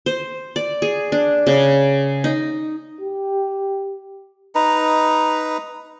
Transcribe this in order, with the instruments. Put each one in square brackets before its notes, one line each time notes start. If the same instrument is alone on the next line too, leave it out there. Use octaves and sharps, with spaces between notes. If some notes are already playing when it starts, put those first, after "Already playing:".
[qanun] C5
D5
G#4
D4
C#3
D#4
[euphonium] G4
[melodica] D#4 B4 A#5